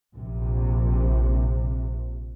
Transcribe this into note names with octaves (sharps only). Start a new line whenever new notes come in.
A#1 C3